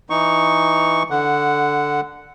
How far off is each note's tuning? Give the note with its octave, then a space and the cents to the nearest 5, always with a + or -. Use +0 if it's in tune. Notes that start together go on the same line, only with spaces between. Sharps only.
E3 +0 D#4 +0 C#6 +0
D3 +0 F#5 +0